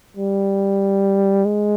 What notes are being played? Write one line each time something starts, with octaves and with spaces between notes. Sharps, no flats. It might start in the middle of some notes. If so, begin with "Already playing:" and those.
G3
G#3